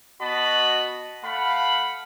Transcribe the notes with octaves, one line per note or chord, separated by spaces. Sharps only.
B3 F#4 D#5 A5 B5
A3 F5 F#5 B5